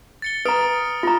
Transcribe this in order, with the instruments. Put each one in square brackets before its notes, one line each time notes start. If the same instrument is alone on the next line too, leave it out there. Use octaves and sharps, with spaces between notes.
[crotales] A6 C#7 G7
[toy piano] B4 A#5 [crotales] D#6 F6 D7
[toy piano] F4 A#5